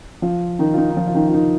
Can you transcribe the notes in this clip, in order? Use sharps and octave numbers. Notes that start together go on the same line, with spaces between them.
F3 F4
D#3 D#4
F4
D#3 D#4
D#4
F3 F4
F4
D#3 D#4
F4
D#3 D#4